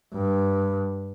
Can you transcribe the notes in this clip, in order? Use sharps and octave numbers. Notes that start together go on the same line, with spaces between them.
G2